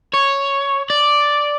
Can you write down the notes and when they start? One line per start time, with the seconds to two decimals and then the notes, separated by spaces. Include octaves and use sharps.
0.13 C#5
0.90 D5